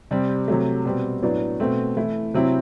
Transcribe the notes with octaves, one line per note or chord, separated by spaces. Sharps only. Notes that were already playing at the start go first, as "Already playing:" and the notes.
C3 G3 C4
C3 F#3 A3
B2 G3 C4
A2 F#3 B3 D4
B2 A3 C4
E3 A3 E4
C3 F#3 C4 E4